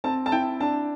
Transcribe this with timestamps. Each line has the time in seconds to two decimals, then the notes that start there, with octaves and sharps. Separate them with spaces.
0.04 C4 A5
0.26 A5
0.32 E4 G5
0.60 D4 A5